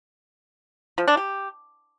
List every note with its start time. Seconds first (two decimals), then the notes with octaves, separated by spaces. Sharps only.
0.98 F3
1.08 D4
1.17 G4